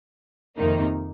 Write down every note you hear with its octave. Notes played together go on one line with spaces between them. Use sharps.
F2 C3 D#3 A#3 D#4